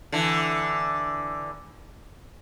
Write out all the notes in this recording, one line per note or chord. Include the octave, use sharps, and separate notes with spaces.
D3 E3